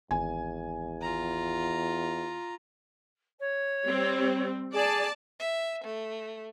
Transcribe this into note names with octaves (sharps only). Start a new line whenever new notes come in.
G#1 E2 G#5
F4 A#5
C#5
G3 C4
G#4 D5 A5
E5
A3